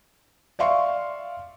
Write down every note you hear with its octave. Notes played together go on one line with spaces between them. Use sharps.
D5 E5 F5 C6 C#6